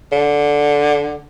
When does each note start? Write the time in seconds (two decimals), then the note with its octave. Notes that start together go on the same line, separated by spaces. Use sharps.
0.12 D3